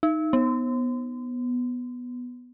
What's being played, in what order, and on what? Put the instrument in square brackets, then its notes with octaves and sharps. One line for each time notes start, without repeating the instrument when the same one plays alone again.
[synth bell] D#4
B3